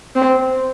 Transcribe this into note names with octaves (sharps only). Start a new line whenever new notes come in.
C4